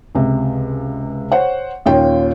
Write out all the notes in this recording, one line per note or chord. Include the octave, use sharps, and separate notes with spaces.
C#2 C3
C5 C#5 F#5
D#2 A#2 C#4 F4 G5